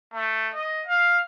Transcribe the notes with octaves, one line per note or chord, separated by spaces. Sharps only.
A3
D#5
F5